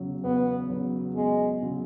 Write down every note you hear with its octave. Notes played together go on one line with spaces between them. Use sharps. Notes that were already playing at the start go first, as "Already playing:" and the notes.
Already playing: E2 C#3 F#3
E2 B3
C#3 F#3
E2 G#3
C#3 F#3